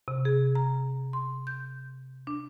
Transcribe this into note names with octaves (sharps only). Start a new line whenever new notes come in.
C3
G#4
A#5
C6
G6
D4